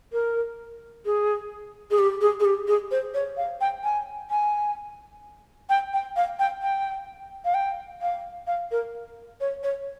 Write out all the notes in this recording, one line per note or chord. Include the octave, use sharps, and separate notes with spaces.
A#4
G#4
G#4
G4
G#4
G#4
G4
G#4
C5
C#5
F5
G5
G#5
G#5
G5
G5
F5
G5
G5
F5
G5
F5
F5
A#4
C#5
C#5